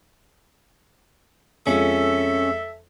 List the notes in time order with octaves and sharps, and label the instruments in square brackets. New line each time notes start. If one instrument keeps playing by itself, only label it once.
[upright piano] F2 G#3 F4 [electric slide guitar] C#4 [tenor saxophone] A4 [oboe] E5